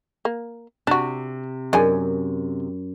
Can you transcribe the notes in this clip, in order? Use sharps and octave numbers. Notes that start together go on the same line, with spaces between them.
A#3
C3 D4 F#4
F#2 D4 G#4 G#5